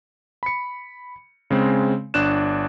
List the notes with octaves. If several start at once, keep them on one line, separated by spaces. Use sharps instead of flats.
B5 C#7
C#3 G#3 C4
G1 D4 F#6 E7